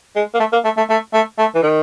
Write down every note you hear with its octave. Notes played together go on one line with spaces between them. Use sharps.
G#3
A#3
A3
A#3
A3
A3
A3
A3
A3
E3
D#3